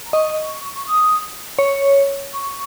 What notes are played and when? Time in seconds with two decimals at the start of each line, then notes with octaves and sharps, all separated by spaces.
0.05 A#5
0.13 D#5 C#6
0.74 C#6
0.86 D#6
1.59 C#5
2.31 C#6